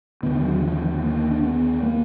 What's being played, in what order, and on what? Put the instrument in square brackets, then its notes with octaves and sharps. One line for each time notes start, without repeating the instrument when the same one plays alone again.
[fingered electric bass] D#2 D3 B3
F#3
F3
A#3
D4
B3
A#3